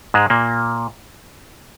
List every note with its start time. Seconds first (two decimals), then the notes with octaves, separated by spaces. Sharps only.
0.14 G#2 G#3
0.30 A#2 A#3